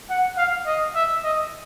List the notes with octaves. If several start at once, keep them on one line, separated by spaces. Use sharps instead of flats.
F#5
F5
D#5
E5
D#5